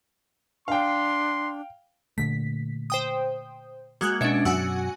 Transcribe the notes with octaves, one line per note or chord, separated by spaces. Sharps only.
D4 F5 G5 C6
A#2 D3 A3 B6
C5 G5 D#6
G#3 A#3 F#4 F#6 G#6
B2 C#4 D4 E5
F#2 B2 F#3 F#4 F#5 G#5 E6